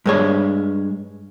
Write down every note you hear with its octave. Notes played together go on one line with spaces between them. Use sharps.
G2 G#3 C#5